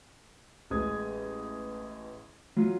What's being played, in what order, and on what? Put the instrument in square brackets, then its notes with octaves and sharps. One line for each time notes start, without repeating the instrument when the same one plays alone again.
[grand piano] A1 G#3 D#6 G#6
F#3 F4